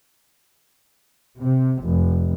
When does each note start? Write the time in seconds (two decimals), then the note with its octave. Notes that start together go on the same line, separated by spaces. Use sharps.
1.39 C3
1.83 F1